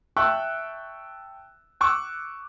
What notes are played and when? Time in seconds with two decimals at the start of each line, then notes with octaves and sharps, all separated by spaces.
0.16 E5 G5 A5 C#6 E6 F#6
1.81 C#6 D6 E6 F#6